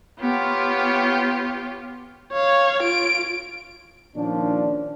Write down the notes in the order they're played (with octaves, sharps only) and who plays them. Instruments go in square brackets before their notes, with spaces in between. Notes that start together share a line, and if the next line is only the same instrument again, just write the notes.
[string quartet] B3 F4 G4 C#5
[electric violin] C#5 F5
F4 D7
[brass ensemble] A#2 D#3 F3 C#4 D4